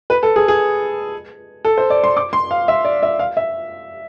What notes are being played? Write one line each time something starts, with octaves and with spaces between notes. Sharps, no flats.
B4
A4
G#4
G#4
A4
C5
D5
C6
D6
C6
F5
E5
D5
E5
F5
E5